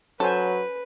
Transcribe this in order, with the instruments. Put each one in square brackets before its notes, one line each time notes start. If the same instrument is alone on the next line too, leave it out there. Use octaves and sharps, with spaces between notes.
[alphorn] F#3 [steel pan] C#4 C5 G#5 [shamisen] A4 [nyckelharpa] B4